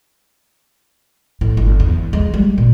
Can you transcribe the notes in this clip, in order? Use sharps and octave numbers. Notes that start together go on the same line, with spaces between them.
A2
G1
E2
G#3
G3
A#2